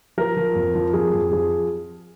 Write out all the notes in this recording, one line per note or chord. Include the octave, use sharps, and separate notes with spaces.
F3 A#4
F3
F2
F3
F2 G#4
F2
F3 G#4